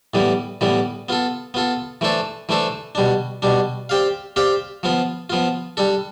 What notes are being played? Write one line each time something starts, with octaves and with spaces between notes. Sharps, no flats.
A2 E3 G3 B3
A2 E3 G3 B3
B3 F4 A4
B3 F4 A4
E3 A3 D4 A4 C5
E3 A3 D4 A4 C5
B2 G3 D4
B2 G3 D4
C4 G4 D5 F5
C4 G4 D5 F5
F3 B3 F4
F3 B3 F4
G3 D4 A4